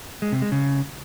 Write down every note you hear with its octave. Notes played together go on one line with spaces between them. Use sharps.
G#3
C3
G#3
C#3